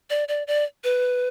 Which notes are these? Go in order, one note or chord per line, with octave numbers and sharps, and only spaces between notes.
D5
D5
D5
B4